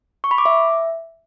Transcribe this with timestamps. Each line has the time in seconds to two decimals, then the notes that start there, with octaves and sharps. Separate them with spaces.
0.24 C#6
0.31 B5
0.38 D6
0.46 E5